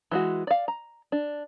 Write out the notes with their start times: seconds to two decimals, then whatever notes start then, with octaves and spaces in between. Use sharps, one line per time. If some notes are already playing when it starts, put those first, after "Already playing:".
0.11 E3 G#3 F#4
0.47 D5 F5
0.68 A#5
1.12 D4